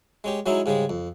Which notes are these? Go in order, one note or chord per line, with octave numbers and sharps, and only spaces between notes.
G#3 C#4 G4
F#3 G#3 C#4 D#4 E4
G#2 C#3 G3 G#3
F2